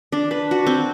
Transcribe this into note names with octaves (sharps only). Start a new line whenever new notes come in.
D4
B4
F#4
C4